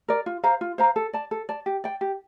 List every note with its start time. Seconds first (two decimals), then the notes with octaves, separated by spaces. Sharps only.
0.08 A#4 D5
0.26 F4
0.44 C5 F5 A#5
0.61 F4
0.78 C5 F5 A#5
0.96 A4
1.13 D5 A5
1.31 A4
1.49 D5 A5
1.66 G4
1.84 D5 G5
2.01 G4